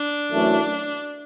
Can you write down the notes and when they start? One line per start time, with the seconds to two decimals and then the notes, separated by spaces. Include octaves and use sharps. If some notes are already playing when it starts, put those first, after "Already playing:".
Already playing: D4
0.32 F#2 E3 A3